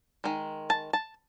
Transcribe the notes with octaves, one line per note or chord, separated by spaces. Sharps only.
D#3 G#3
A5
A5